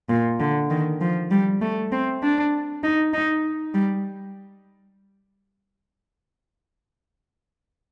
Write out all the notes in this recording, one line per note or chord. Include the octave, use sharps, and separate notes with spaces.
A#2
D3
D#3
F3
G3
A3
C4
D4
D#4
D#4
G3